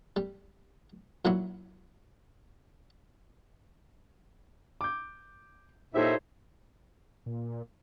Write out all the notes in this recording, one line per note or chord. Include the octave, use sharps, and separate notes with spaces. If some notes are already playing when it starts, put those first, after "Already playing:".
G3
A#2 F#3 E4 F#4
D6 G6
A#2 D#4 E4 G4 A4 C5 C#5 E5
A#2